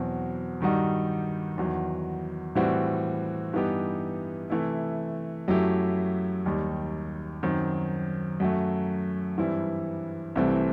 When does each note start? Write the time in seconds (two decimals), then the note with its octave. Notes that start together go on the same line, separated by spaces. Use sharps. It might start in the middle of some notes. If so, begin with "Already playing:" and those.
Already playing: E2 B2 F#3 C4
0.60 G2 D#3 G3 D#4 F#4
1.58 E2 D#3 F#3
2.55 A2 E3 G3 C4 F#4
3.53 G2 E3 B3 D#4 G4
4.50 C3 E3 A3 E4
5.48 F#2 F#3 A3 E4 G4
6.46 D#2 D#3 G3 D#4
7.43 F#2 D#3 F#3 C4
8.40 F#2 F#3 A3
9.38 G2 E3 G3 C4 E4
10.36 C2 C3 E3 A3 C4